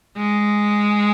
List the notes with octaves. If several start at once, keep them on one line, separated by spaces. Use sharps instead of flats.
G#3